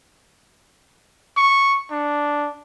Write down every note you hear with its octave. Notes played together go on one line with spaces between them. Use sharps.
C#6
D4